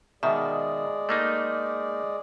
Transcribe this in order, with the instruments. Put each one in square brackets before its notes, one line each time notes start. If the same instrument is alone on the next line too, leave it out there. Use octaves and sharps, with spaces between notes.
[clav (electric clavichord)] B2 D#3 [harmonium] G#3 G#4 D5 [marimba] E5
[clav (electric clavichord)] A3 A#3 D#4